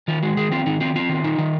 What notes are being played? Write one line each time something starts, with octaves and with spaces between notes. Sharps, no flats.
D#3 F4
G#3 F#4
D#3 G#4
C4 F4
D#3 D#4
C4 F4
C4 F4
D#3
D#4
D#3